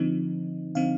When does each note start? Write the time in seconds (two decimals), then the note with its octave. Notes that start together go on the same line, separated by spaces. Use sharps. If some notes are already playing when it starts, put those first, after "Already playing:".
Already playing: D3 F3 C4 D#4
0.75 D3 F3 C4 D#4 F5